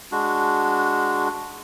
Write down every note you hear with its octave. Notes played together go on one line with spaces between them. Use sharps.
G#3 D4 F#4